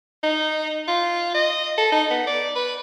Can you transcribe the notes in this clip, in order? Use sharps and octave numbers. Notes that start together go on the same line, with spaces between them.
D#4
F4
D#5
A4
D#4
B3
D5
B4